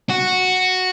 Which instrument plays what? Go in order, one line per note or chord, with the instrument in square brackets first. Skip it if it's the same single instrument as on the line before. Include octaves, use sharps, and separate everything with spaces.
[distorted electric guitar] F#4